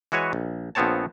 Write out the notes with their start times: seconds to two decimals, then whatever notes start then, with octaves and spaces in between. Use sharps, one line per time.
0.12 E3 G#3 F#4 B4 C#5 G#5
0.33 A#1
0.75 A#1 F3 B3 C4 C#5 A5